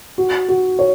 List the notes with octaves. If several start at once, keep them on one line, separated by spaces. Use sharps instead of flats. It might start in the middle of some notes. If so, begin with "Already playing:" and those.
F#4
F#4
C#5